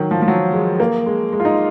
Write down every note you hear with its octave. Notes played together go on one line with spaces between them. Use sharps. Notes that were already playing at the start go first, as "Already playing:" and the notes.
Already playing: D#3 F#3
F3
F3
F#3
G#3
A#3
G#3
G#3
F4
D#4